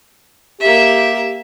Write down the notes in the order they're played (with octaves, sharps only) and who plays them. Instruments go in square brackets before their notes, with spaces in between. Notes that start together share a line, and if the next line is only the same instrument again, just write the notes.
[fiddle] A#3 E5 [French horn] G4